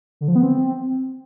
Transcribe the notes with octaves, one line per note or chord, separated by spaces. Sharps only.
D3
F3
B3
C4